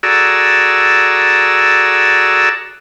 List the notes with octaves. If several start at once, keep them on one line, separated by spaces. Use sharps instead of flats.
F#4 G#4 A4 D5 A#5 E6